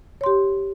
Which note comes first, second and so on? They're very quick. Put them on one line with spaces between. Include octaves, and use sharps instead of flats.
C#5 C6 G4